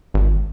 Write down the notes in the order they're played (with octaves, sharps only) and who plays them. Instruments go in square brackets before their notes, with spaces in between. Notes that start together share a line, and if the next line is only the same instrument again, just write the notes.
[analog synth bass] G#1